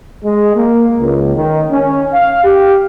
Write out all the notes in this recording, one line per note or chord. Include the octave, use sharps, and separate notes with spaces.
G#3
A#3
C#2
D#3
C#4
F5
G4